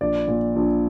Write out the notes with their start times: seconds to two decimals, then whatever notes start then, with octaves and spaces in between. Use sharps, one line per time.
0.01 A#1 D5
0.28 A#2
0.56 A#1